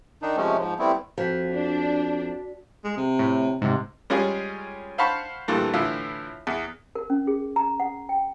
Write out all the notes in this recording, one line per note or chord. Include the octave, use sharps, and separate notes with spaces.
D#3 D4 D#4
C3 F3 G#3 A3 C#4
G#2 F3
G3 A3 B3 C4 E4
F2 F3 F#4 B6
D4
G#3
C3
A2
G#2 C3
G3 G#3 C#4 F4 G#4
C5 F5 F#5 A5 B5 C#6
G2 A#2 E3 A3
A2 D3 E3 E4 F4
E2
A#4
C#4
G#4
A#5
F#5
G5